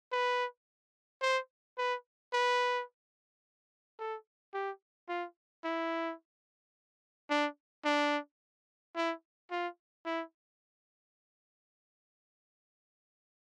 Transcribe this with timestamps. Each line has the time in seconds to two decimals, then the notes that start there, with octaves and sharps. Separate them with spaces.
0.12 B4
1.22 C5
1.78 B4
2.34 B4
3.99 A4
4.54 G4
5.09 F4
5.64 E4
7.30 D4
7.85 D4
8.96 E4
9.51 F4
10.06 E4